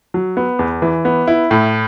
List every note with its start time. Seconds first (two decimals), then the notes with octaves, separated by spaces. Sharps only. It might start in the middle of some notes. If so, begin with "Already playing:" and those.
0.14 F#3
0.37 B3
0.59 E2
0.82 E3
1.05 B3
1.27 E4
1.51 A2